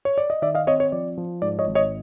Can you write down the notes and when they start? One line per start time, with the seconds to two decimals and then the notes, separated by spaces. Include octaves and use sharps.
0.05 C#5
0.18 D5
0.30 D#5
0.42 D#3 D5 E5
0.55 D#5 F5
0.67 C4 C#5 D#5
0.80 C#5
0.92 F3 D5
1.18 F3
1.42 G#2 D5
1.59 C#5 D#5
1.67 G#1
1.75 C#5 D#5